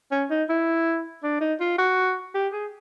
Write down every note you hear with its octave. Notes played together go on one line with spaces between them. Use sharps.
C#4
D#4
E4
D4
D#4
F4
F#4
G4
G#4